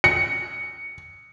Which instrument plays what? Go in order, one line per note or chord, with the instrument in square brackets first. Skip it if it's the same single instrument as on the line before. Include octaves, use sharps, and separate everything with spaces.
[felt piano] C#7